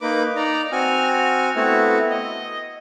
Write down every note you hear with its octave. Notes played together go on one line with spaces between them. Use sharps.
A#3 D#4 B4 D6
D#4 D5 A#5
C4 F#4 G#5 F6
A3 B3 C4 E4 F#4
D#5